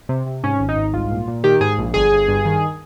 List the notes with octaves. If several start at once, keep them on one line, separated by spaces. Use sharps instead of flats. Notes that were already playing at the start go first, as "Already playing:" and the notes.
C3
C3
G#2 C#4
G#1
D#4
G#2
C2 F4
A#2
A#2
D#3 G4
G#2 G#4
A#1
G1 G#4
G1
G2
D#3